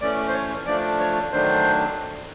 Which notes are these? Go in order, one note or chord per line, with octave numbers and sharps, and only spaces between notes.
E3 A3 C#4 D5
C5
C#5
F3 A3 D4 D5
C#5
D#3 F#3 A3 D4 C5